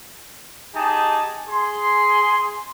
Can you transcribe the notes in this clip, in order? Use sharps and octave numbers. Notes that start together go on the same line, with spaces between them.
D#4 G4 G#4 D#5 G#5 A5
G#4 C6